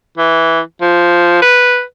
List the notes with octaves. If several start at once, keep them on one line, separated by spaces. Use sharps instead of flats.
E3
F3
B4